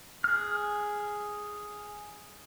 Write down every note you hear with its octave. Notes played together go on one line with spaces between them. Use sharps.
G#4 F6